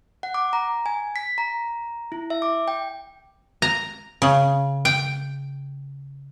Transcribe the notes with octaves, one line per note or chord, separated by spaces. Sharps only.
F#5
D6
A#5
G#5
B6
A#5
E4
E5
D6
G5
A#5
C#3
G5